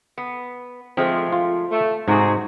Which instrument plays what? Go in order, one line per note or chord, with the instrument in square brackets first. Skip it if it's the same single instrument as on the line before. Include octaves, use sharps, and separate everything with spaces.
[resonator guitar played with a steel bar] B3
[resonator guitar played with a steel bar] F3 G#3 A3 [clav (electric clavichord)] C4
[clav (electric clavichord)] F4
[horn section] A3
[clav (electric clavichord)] G#2 [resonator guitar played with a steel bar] C3 [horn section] D#4 F#4 G#4